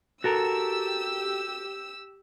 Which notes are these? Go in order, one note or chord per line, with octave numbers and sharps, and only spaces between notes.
F#4 G4 A4 A#4 E6